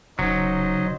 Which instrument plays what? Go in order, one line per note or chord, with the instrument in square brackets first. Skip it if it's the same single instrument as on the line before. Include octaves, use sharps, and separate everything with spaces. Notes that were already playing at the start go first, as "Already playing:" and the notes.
[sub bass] D1 [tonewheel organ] C#3 [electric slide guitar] F#3 [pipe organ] D#4 C5 D#5